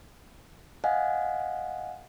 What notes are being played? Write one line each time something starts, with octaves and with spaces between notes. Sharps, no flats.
D#5 F5 F#5 G#5